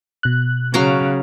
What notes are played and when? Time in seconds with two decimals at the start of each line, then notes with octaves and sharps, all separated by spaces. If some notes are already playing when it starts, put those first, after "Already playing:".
0.23 B2 F#6
0.74 C#3 F#3 F5 A#5